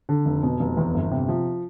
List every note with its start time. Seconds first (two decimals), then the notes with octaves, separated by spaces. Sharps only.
0.09 D3
0.26 F1
0.43 B2
0.60 F1
0.77 E2
0.94 G1
1.11 C3
1.29 F3